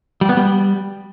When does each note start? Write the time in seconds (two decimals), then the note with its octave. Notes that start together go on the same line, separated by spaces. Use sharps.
0.21 G3
0.29 B3
0.37 G3